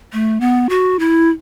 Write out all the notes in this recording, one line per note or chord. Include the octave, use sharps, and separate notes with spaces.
A3
B3
F#4
E4